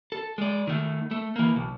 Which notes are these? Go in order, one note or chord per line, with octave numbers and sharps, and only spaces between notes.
A4
G#3 D5
D#3 A3
A3
E3 A#3
B1